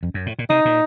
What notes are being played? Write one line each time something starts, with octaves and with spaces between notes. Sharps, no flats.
F2
F#2
A2
A#2
C3 D#4
A#2